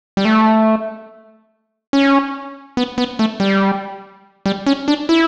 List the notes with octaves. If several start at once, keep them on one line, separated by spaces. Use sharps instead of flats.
G3
A3
C#4
B3
B3
A3
G3
G3
C#4
D4
E4